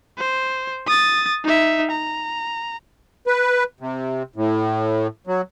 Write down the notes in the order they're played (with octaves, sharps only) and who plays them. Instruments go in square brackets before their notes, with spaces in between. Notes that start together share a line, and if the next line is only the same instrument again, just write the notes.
[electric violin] C5
D#6 A6
D#4 E5
A#5
[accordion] B4
C3
A2
F#3